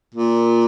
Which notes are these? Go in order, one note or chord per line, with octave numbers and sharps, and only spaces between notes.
A#2